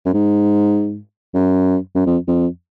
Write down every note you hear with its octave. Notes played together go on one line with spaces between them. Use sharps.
F#2
G#2
F#2
F#2
F2
F2